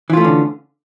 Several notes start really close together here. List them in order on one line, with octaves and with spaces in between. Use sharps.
E3 F4 A3 C#4 D3